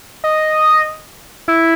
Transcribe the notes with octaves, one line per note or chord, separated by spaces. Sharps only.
D#5
E4